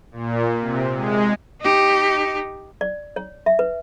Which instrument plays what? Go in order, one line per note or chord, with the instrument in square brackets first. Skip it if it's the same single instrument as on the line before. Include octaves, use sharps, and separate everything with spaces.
[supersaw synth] A#2
C3
G#3
[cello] D#4 G4
[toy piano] D5
C#5
E5
B4